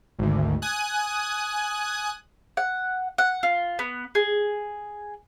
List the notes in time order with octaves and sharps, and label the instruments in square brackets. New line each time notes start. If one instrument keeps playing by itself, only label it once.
[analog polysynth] G#1 D2
G#5 D#6 F#6
[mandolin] F#5
F#5
F4
B3
G#4